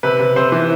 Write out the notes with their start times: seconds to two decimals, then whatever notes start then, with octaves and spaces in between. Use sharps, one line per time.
0.03 C3 B4
0.20 C3
0.36 C3 C5
0.52 E3